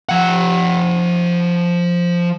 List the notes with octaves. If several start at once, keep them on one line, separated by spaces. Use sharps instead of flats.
F3 F#5